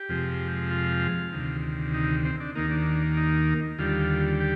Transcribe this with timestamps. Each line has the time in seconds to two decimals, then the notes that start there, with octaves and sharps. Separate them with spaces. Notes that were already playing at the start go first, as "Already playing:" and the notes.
Already playing: G4
0.09 F2 C3 F3 G#3
0.71 F4
1.32 D2 C3 D#3
1.94 D#4
2.25 C4
2.40 D4
2.55 D#2 D#3 A#3 D#4
2.71 D4
3.17 D#4
3.79 D#2 D3 G3 F4
4.40 G4